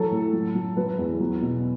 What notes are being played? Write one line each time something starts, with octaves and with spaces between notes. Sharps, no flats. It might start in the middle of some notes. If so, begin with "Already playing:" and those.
Already playing: E3 F#3 A4
A2
F#3
F#3
F#3 B4
E2
F#3
B2